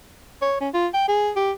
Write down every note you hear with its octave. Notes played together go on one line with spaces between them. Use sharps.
C#5
C#4
F4
G5
G#4
G4